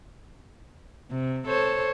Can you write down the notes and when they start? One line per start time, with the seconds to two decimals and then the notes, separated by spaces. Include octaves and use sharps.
1.10 C3
1.48 A4 C5 C#5